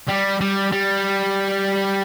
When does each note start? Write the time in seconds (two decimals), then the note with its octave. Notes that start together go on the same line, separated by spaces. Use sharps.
0.09 G3
0.41 G3
0.72 G3